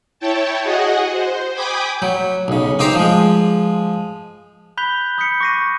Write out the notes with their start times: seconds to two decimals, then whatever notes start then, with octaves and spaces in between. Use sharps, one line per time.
0.20 E4 C#5 G5 A5
0.63 F#4 G#4 D#5 F#5
1.11 C5
1.53 G5 G#5 B5 D6 D#6 G6
2.02 F#3
2.48 B1 C#3
2.79 C4 D#4 G4 C5 G5 A#5
2.95 F3 G#3
4.77 B5 F#6 G6 B6 F7 G7
5.18 B5 D#6 F#6 G6 B6 C#7
5.40 C#6 D6 A#6 C7 D#7